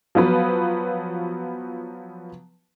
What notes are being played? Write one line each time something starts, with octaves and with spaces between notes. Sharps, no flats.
F3 F#3 B3 B4